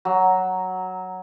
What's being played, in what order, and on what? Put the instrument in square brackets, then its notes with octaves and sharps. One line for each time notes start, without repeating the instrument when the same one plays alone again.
[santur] F#3